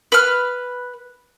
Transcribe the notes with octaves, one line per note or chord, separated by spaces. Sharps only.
B4 F6